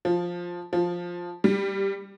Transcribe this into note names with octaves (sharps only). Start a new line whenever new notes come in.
F3
F3
G3